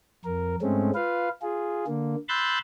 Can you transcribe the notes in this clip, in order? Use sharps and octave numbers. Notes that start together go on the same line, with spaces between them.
F2 A#4
G#2 G#3 A3 C4 C#4
F4 B4 F5
F4 G#4
D3 A#3
B5 C6 E6 F#6 G6 A6